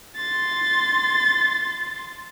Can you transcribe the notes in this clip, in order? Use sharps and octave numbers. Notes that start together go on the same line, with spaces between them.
C6 A6